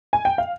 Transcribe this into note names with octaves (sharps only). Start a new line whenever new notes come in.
G#5
G5
F5